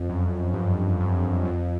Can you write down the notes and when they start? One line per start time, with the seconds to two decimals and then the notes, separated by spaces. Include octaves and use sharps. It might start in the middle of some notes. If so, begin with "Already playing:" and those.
Already playing: F2
0.09 F#2
0.53 G2
1.00 F#2
1.45 F2